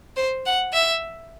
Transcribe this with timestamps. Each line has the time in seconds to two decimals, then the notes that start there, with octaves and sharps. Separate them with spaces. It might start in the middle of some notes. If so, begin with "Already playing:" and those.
0.16 C5
0.46 F#5
0.73 E5